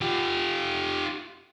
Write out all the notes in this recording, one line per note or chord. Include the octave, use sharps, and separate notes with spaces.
F4 G4